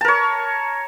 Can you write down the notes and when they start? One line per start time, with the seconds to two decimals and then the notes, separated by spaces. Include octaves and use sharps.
0.01 A5
0.05 A#4
0.08 C#5